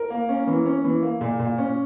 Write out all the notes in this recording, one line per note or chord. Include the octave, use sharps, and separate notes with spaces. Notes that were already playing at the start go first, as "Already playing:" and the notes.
Already playing: A#4
A#3
C#4
E3
C#4
E3
A#3
A#2
A#2
C#4